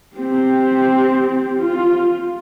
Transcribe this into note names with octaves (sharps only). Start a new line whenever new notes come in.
C4 G4
F4